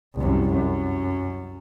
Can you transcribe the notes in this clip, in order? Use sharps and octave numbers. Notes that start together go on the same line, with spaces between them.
C2 F#2
F#2